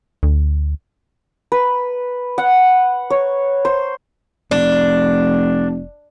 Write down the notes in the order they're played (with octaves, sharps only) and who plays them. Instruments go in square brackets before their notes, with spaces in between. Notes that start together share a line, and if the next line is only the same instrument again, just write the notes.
[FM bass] D2
[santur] B4
F#5
C#5
C5
[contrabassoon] F1 [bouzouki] D4